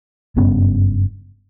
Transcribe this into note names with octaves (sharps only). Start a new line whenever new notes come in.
F#1 G2 B3 C#4